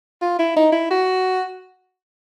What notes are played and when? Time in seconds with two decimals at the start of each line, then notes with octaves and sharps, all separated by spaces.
0.22 F4
0.39 E4
0.56 D#4
0.72 E4
0.91 F#4